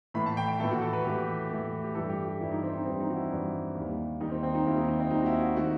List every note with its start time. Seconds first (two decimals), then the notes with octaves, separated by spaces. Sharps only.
0.14 A2 E3 A3 B5
0.26 A5
0.37 G5
0.48 G5
0.60 A2 E3 A3 A4
0.71 F#4
0.82 A4
0.93 B4
1.05 A2 E3 A3 G4
1.50 A2 E3 A3
1.84 G4
1.95 G2 E3 G3 A4
2.09 G4
2.25 G4
2.40 G2 E3 G3 E4
2.51 D#4
2.63 C4
2.73 D#4
2.85 G2 E3 G3 C4
3.00 D#4
3.10 F#4
3.16 E4
3.31 G2 E3 G3
3.75 D#2 D#3 G3
4.20 D#2 D#3 G3 D#4
4.31 C4
4.43 C4
4.55 D#4
4.66 D#2 D#3 G3 E4
4.77 D#4
4.88 D#4
5.00 C4
5.11 D#2 D#3 G3 D#4
5.22 F#4
5.26 E4
5.40 F#4
5.56 D#3 A3 F#4